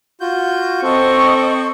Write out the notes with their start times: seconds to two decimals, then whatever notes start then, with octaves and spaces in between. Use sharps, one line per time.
0.21 F4 F#4 G6
0.83 C4 A4 C5 D#5 C#6